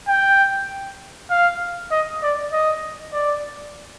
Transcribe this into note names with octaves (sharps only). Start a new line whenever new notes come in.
G5
F5
D#5
D5
D#5
D5